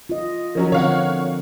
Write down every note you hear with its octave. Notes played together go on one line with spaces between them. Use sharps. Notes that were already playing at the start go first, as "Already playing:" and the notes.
F4 D#5
F3 F#3 C#4 D#4 A#4
D3 C4 C#5 F5 F#5